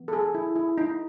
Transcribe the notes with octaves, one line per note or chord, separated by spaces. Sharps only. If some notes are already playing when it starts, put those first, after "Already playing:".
Already playing: E3 B3
A4
G#4
E4
E4
D#4